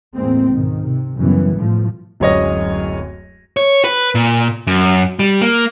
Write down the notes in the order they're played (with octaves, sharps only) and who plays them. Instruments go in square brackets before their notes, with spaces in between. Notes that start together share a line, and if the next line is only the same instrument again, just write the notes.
[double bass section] E2 A2 G#3 A#3 C4
C#2 G#2 B2 D#3
C3
F#2 C#3 E3 G3 B3
A2 F3
[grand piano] D1 F#2 G#3 C#5 D#5 A#6
[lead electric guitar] C#5
B4
A#2
F#2
G3
A#3